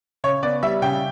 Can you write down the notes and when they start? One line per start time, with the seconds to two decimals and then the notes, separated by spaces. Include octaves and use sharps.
0.24 C#3 C#5
0.43 B3 D5
0.63 G3 E5
0.82 C#3 G5